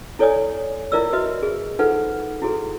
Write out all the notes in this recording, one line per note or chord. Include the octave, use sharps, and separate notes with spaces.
E4 A4 C#5 D5 G#5 D#6
E4 F4 A#4 D5 E5 E6
F#4 B4 D#5 E5
G#4
D#4 F4 A4 B4 C5 F#5
E4 F#4 G#4 A4